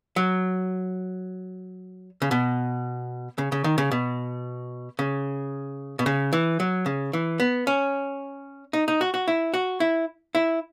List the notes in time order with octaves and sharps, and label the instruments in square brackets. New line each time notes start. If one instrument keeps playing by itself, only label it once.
[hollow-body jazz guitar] F#3
C#3
B2
C#3
C#3
D#3
C#3
B2
C#3
B2
C#3
E3
F#3
C#3
E3
B3
C#4
D#4
D#4
F#4
F#4
E4
F#4
E4
E4